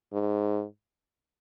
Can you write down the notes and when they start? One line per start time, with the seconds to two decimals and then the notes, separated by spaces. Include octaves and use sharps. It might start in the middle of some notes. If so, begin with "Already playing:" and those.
0.13 G#2